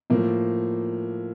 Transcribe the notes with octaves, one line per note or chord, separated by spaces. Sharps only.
A2 F3 A#3